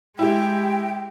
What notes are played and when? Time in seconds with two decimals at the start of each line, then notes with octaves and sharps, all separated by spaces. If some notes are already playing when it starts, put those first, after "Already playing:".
0.19 G#3 E4 G4 G5